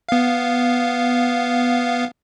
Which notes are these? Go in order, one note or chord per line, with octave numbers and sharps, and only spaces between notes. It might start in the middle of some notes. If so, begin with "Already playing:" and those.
B3 F5